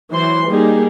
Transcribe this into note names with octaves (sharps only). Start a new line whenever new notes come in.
E3 F#3 C5 C6
G3 A#3 D#4 G4 G#4